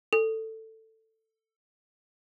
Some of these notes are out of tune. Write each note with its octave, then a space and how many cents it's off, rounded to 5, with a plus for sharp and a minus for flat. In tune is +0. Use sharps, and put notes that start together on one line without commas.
A4 +10